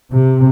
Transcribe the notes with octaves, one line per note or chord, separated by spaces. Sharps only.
C3